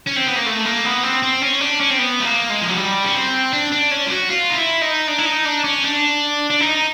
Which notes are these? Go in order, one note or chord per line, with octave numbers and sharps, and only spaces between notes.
C#4
C4
B3
A#3
A3
A#3
B3
C4
C4
C#4
D4
C#4
C4
B3
A3
A#3
G#3
F3
F#3
G3
C#4
C4
D4
D4
C#4
F4
F#4
F4
D#4
E4
D#4
D4
E4
D#4
D4
C#4
D4
D4
D#4